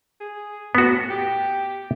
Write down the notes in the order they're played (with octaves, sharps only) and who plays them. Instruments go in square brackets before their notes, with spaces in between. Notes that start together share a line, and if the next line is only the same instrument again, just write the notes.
[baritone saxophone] G#4
[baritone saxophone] A2 [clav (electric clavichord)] B3 F#4
[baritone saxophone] G4